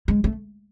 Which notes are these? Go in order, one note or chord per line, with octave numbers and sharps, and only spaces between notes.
G#3
A3